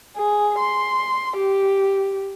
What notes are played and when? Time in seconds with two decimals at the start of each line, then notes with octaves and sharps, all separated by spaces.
0.17 G#4
0.59 C6
1.37 G4